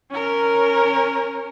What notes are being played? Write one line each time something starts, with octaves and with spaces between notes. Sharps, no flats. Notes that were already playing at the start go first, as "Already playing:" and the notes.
C#4 A#4